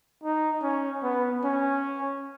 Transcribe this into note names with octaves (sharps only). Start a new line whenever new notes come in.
D#4
C#4
B3
C#4